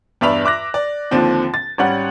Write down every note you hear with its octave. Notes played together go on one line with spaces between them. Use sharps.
E2 G2 D5 E5 B5 F7
E5 D6 F#6 A#6
D5
D#2 D3 F3 C4 D4
A6
G#1 G3 C#4 F#5